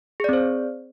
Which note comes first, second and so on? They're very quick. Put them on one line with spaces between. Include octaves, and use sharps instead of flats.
G#4 D5 C4 C5